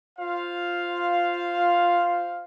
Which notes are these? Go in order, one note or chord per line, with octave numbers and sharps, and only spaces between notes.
F4 C5 F5